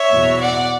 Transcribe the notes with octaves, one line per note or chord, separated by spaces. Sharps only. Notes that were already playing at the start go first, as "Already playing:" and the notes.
Already playing: C#5 E5
E2 B2 F#3
D5 F#5